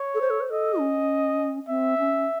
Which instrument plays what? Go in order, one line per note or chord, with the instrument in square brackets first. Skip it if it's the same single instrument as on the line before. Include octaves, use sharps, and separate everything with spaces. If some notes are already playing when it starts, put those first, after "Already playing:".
Already playing: [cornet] C#5
[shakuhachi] A4
C5
A4
C5
[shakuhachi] A4 [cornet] D#5
[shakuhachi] C#4
[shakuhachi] C4 [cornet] E5
[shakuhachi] C#4